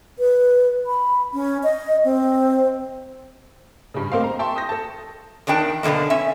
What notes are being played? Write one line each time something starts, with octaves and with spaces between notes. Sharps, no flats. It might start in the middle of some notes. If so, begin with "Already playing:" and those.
B4
B5
C#4
D#5
C4
G2 C#3
A3 A#3 C4 C5 D#5 F5
A#5
E5 G5 A5 C6 C#6
D#6 G6 A#6
A4 A5
E2 D#3 D4 G5 A5
F#2 B2 D3 E3 A#3
C#4 E5